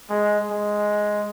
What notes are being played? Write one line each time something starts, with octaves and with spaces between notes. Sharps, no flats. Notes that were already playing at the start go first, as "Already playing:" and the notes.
G#3
G#3